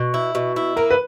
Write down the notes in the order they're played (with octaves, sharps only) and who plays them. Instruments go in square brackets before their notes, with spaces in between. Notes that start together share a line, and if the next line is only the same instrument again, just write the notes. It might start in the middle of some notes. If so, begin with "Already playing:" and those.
Already playing: [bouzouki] B2
E4
B2
E4
[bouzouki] A#3 [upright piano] A#4
[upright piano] B4